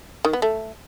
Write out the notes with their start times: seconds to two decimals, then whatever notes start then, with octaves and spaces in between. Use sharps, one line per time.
0.25 D#3
0.33 B3
0.42 A3